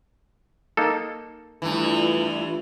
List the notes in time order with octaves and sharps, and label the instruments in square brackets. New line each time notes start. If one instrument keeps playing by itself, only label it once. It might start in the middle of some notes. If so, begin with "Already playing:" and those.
[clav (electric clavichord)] A#3 D#4 A4
[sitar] G2 E3 [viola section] A3 E4 F4